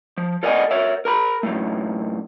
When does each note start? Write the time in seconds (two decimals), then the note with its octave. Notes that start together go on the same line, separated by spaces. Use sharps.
0.18 F3
0.43 A4 A#4 D5 D#5 F#5 G#5
0.71 A#4 C#5 E5
1.05 A#4 A#5 B5
1.43 F#2 A2 A3